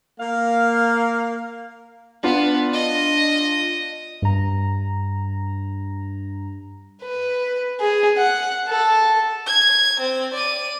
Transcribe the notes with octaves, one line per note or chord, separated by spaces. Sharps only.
A#3 F5
B3 D4 F4
D#5
G2 A#5
B4
G#4
F#5
A4
G#6
C4
D5 D#7